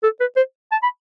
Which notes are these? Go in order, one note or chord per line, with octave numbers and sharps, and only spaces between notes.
A4
B4
C5
A5
B5